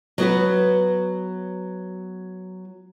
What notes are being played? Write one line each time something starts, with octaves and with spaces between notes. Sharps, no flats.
F#3 B3 F#4 B4